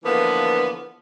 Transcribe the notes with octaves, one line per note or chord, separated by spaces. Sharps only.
D3 E3 F3 A#3 B3